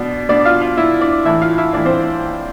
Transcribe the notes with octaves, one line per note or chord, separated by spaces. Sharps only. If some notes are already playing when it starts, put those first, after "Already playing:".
Already playing: B2 D4
B2 D4 D5
F4 F5
F4 F5
B2 E4 E5
D4 D5
A2 E3 E4 E5
F4 F5
E4 E5
A2 E3 D4 D5
C4 C5